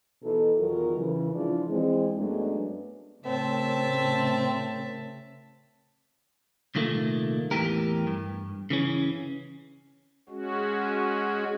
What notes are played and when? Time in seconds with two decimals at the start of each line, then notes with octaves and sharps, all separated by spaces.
0.23 B2 E3 D#4 A4
0.59 E2 D#3 F#3 F4 A#4
0.98 C#3 E3
1.34 F3 G#3 D4 E4 F4
1.70 E3 G#3 C4
2.18 F#2 F#3 G#3 A3 B3 D4
3.25 A2 C#3 C4 A#4 C5 C#5 E5 A5
6.75 C2 A#2 D#3 A3 A#3
7.51 E2 A2 E3 G4 A#4
8.07 G2
8.70 C#3 E3 C#4
10.29 G#3 C#4 F#4